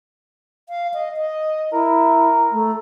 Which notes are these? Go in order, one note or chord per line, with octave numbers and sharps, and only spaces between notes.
F5
D#5
D#5
E4 A#4
A3